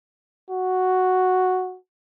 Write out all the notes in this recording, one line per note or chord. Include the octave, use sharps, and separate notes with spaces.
F#4